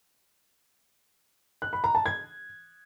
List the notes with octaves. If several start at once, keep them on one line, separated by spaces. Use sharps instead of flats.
F#6
B5
A#5
A5
G#6